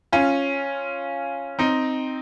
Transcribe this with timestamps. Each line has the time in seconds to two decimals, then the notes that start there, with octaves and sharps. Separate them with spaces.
0.12 C#4 F4
1.59 C4 D#4